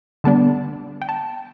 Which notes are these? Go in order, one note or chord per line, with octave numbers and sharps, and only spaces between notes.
D3 G3 B3 D4 A5
G5
A5